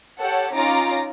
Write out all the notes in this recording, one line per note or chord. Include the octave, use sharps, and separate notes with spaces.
G4 A4 C#5 F#5
C#4 D#4 F4 A#5 D6 A#6